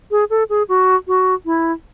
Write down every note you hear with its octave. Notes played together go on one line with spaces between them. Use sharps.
G#4
A4
G#4
F#4
F#4
E4